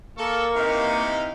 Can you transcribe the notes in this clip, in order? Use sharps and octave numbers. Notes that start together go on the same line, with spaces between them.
A#3 A4 A#4 C#6
C3 E3 D#4 F5